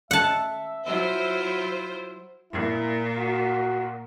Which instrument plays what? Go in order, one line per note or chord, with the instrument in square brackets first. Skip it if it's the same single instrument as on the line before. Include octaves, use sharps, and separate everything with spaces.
[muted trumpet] E5 [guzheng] F#5 A5
[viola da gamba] F#3 E4 F4 [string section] C5
[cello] A#2 [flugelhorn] E4
[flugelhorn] F#4